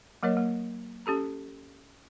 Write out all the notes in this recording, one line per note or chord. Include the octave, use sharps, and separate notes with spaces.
F#3 A#3 A#4 C#5 D#5
A#3
C#4 G4 A4 A#5